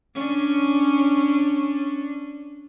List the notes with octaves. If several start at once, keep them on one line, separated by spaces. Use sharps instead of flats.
C#4 D4